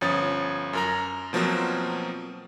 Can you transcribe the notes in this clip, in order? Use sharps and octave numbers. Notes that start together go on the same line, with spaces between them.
G1 F3 C#4 C#5 D#6 A6
F#2 A#4 A#5
B2 F3 F#3 A#3 C4